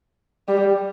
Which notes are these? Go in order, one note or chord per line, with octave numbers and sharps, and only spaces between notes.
G3